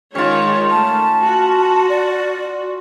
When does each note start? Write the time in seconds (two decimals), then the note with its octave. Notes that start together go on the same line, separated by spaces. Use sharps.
0.15 D#3 G#3 C#4 F4 C#5
0.71 A3 A5
1.23 F#4
1.89 D5